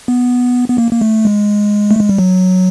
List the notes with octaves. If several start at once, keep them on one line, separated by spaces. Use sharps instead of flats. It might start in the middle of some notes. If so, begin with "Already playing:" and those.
B3
B3
A#3
A#3
A3
G#3
A3
G#3
G3
F#3